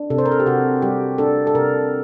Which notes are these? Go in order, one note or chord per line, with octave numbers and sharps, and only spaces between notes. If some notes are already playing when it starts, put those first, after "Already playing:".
Already playing: D4
C3 A4
C5
A#4
A4
G4
C3 F#4
G3 G4
D4 A4
A4
C3 A#4